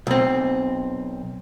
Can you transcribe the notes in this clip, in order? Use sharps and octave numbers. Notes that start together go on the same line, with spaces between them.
B1 C4